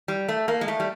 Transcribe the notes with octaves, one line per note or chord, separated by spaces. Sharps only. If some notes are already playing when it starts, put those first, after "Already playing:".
G3
A3
A#3
G#3
A3
G3